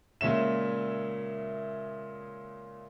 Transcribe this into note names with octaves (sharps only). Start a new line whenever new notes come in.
A#2 C#3 G#3 C#5 E5 E7